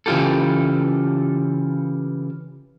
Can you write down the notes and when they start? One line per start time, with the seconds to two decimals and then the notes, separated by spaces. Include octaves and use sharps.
0.06 C#3 E3 G3 F4 G4 A4